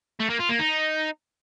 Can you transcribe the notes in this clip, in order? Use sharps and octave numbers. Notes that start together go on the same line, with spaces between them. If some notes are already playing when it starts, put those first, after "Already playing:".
A3
A#3
F4
A#3
D#4